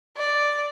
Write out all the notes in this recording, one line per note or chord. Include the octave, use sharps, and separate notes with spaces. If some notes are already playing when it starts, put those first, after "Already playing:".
D5